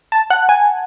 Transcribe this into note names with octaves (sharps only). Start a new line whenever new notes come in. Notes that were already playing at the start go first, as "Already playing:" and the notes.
A5
F#5
G#5